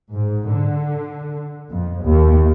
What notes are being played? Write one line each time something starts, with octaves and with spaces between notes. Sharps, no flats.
G#2
D3
F2
D#2